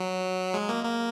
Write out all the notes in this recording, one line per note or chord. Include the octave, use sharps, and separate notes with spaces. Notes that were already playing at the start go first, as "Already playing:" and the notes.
Already playing: F#3
G#3
A#3
A#3